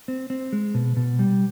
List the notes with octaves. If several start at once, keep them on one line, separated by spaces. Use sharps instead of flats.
C4
C4
G#3
B2
B2
G3